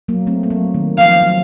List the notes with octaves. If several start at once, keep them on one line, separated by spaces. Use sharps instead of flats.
F#3 A#3
A3 C4
A3
F#3 A#3
D#3
F3 F5
F#3